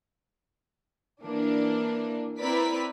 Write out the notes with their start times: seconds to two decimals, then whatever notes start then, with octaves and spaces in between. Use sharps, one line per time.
1.22 E3 A#3 D4
2.38 C4 E4 A#4 B4 D5 B6